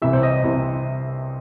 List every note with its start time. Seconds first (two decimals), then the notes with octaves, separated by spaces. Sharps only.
0.02 C2 C3 E3 E5
0.13 C5
0.23 D#5
0.44 C2 C3 E3